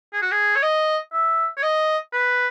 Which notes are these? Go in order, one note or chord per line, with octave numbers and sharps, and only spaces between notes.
G#4
F#4
G#4
C#5
D#5
E5
C#5
D#5
B4